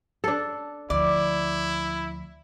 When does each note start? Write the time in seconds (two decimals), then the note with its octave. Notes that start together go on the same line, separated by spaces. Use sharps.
0.24 D4 A4
0.90 D2 F3 E4 D5